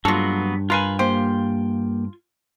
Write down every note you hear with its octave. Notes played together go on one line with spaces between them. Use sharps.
G2 F#3 A#3 B3 F4 A4
F4 A#4 B4 F5 G#5
A#3 G4 C5 G5